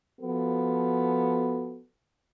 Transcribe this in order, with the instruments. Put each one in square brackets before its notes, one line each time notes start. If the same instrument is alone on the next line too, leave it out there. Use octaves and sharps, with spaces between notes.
[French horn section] F3 B3 F#4 A4